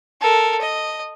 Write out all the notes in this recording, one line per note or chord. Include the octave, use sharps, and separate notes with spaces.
A4 A#4
D#5